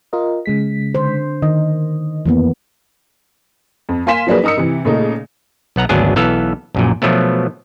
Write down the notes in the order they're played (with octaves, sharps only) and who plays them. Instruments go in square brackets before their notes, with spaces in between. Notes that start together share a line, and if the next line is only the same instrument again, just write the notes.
[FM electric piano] F4 A#4 D#5
C#3 G#3 B6
[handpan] D3 C5
[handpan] D#3 [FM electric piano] D#5
[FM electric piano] F2 [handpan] E3 A#3 B3
[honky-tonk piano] F2
A#3 F5 G#5 C6 B6 E7
F3 F#3 A#3 D4 G#4 B4
D#4 A#4 D#6 E6 C#7
C3 E3
A#2 C#3 A3 D#4
[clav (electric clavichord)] B1 B3 F#5 A#5
G#1 D2 F#3 B3 D4 G#4
B1 E3 B3 A4 F5
A#1 F#2 A#2
B2 F3 F#3 A3 B3